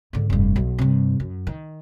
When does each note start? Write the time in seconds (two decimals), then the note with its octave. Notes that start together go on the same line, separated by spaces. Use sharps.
0.13 G#2 D3
0.30 F1 G2
0.56 B1
0.78 G2 C3
1.20 F#2
1.47 D#3